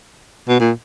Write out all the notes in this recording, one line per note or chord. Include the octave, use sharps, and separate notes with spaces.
B2
A#2